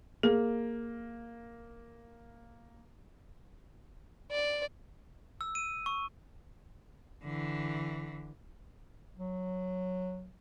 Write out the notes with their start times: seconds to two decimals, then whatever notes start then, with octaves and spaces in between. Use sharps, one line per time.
0.23 A#3 G#4
4.31 D5
5.41 E6
5.55 D#7
5.86 C#6
7.23 D3 E3
9.18 F#3